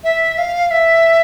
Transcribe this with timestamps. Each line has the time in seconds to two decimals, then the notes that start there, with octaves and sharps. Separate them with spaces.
0.04 E5
0.38 F5
0.71 E5